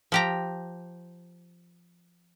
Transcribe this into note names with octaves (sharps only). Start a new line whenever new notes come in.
F3 G4 A#5